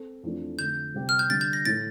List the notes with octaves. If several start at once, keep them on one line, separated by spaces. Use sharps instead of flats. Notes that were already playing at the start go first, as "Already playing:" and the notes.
Already playing: C4 A4
F2 E3 A3 D4
F2 D3 A3 G6
C3 G3 C4 G4
F6
G6
D3 G3 D4 A6
G6
A#6
A2 E3 A3 A6